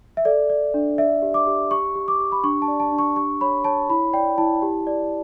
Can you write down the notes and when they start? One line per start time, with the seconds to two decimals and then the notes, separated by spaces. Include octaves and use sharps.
0.17 E5
0.25 A4 D5
0.50 D5
0.74 D4
0.98 D5 E5
1.22 G4
1.34 D6
1.47 G4
1.71 G4 C#6
1.95 G4
2.08 D6
2.20 G4
2.32 B5
2.44 D4 C#6
2.62 A5
2.68 D5
2.80 A5
2.92 D4
2.99 C#6
3.16 G4 C#6
3.41 C#5 B5
3.64 C#5 A5
3.89 E4 B5
4.13 D5 G5
4.38 E4 A5
4.62 G4
4.87 D5